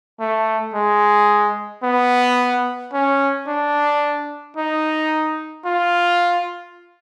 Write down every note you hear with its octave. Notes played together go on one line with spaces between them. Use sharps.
A3
G#3
B3
C#4
D4
D#4
F4